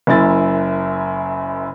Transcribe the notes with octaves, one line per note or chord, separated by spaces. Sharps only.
F#1 F#2 E4 A6